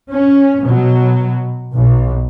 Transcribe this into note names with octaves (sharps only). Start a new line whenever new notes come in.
C#4
B2 F#3
B1